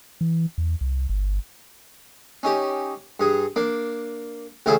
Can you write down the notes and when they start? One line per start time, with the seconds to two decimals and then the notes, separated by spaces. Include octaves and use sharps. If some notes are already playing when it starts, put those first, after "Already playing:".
0.21 E3
0.58 E2
0.81 C2
1.09 G1
2.43 C#4 D#4 G4
3.20 G2 G#4
3.56 A#3 D4
4.66 A1 C#3 E4 F4 G#4 A4